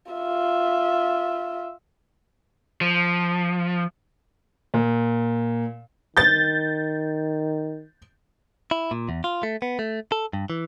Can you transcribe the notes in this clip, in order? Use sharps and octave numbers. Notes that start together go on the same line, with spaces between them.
F4 E5
F3
A#2
D#3 G6 A6
E4
A#2
E2
F4
A3
B3
A3
A4
G2
E3